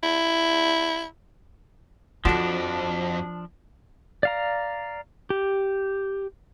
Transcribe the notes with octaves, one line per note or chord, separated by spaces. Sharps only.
E4
F2 F3 D4 F4 F#4 A4
D5 F5 A#5
G4